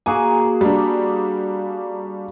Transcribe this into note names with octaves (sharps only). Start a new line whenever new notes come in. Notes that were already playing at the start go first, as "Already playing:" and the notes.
A#3 F#4 G#4 G#5
G3 D4